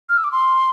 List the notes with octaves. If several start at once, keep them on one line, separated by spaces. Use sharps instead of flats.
F6
E6
D6
C6